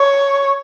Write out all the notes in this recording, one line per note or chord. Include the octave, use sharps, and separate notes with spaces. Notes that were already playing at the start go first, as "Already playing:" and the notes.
Already playing: C#5